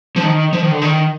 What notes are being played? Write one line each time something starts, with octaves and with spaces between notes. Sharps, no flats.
F3
D#3
F3
D#3
D3
D#3